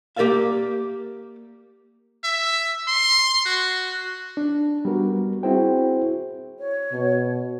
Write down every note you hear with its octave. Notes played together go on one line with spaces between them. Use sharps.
A#3 G4 A#4 D5 E5 F5
E5
C6
F#4
D4
G3 B3 F#4 A#4
C4 E4 F#4 G#4 C5 G5
C#5
B2